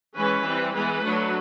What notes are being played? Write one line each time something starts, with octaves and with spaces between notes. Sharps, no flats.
E3 G#3 C#4 B4
E3 G3 C4
E3 G#3 B3 B4
F#3 A3 D4